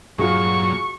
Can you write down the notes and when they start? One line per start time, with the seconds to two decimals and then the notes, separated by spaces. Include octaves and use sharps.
0.18 G2 A#2 F#3 F4 F#4 G#4 C#6